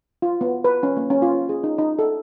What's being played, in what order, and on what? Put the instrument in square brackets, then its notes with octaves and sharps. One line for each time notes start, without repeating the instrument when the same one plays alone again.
[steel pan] F4
B3
B4
C#4
A#3
C#4
F4
G#4
D#4
D#4
A4